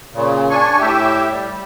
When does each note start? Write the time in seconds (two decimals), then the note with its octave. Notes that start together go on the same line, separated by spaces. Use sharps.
0.14 A#2 C#3
0.50 D4 G#5 C#6
0.79 A2 G4 E5
1.31 G3